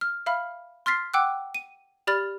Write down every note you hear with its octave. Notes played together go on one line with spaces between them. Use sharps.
F6
E5 F5 B5 F6
C6 F6 A6 B6 C7
F#5 G5 D6 E6 F#6
D#7
G4 D5 B5 F6 A6